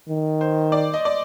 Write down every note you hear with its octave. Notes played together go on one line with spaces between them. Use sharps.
D#3
C5
D5
D#5
D5